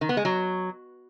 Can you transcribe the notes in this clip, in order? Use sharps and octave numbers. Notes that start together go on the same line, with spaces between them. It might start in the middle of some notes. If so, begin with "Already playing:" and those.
D#3
B3
G#3
F#3